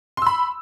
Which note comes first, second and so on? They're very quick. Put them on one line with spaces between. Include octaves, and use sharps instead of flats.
C6 E6 B5